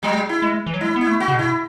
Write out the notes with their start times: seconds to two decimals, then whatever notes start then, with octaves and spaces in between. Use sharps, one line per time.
0.03 F#3 G#3
0.29 E4
0.42 G#3
0.66 E3
0.74 F#3
0.81 G#3 E4
0.96 B3
1.01 E4
1.07 A3
1.20 F#4
1.28 C#3
1.33 B2
1.39 E4